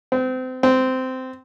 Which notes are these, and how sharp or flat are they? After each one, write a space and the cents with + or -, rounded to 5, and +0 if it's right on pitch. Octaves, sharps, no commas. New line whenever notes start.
C4 -30
C4 -15